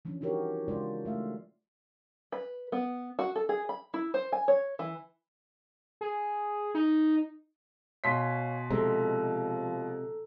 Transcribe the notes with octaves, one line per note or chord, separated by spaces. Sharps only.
E3 F3 C#4 D4
D#4 E4 F#4 G4 A#4 C#5
C#3 G#3 D4 F4 C5 D5
A3 E5 F5
B4
B3
F#4
A4
G#4
B5
E4
C5
G#5
C#5
E3
G#4
D#4
B2 C#5 F5 G#5 C6 B6
C3 F3 G#3 A4 A#5